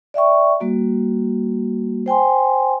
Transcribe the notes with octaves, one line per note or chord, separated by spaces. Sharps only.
D5 E5 G5 C#6
G3 A#3 F#4
C5 G5 G#5 C6